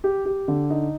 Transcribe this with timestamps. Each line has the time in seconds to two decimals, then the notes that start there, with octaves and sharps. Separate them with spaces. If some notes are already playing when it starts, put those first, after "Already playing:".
0.04 G4
0.25 G4
0.48 D3
0.70 D#4